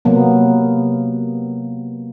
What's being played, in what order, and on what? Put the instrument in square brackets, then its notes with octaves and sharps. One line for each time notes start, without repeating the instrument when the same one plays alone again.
[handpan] C3 F#3 A#3 B3